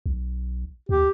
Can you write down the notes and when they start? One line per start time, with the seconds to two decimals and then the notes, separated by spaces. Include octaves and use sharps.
0.06 B1
0.89 D#2 G4